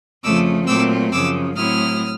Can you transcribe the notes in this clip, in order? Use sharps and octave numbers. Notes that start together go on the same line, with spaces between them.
F2 C#3 F3 A3 D6 E6
A#2 F#3 A3 C4 D6 E6
F#2 C#3 F3 D6 E6
A2 F#3 A3 C4 E4 D#6 F6